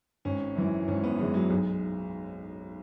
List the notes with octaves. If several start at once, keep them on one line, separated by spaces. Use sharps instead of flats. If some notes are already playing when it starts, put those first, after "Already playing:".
G#1 C#4
F#2 E3
G#1 C#4
B3
F#2 E3 G#3
F#3
B1 G#3